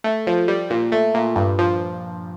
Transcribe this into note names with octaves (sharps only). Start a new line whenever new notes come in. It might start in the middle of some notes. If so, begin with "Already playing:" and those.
A3
F3
G3
A#2
A3
A#2
G2
F3